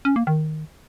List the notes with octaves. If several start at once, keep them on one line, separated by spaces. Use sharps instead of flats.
C#4
A#3
D#3